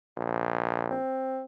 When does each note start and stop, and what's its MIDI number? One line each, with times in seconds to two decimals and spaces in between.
0.17 0.96 34
0.91 1.44 60